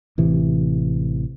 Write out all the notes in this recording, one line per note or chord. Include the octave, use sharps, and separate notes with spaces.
A1 C3 E3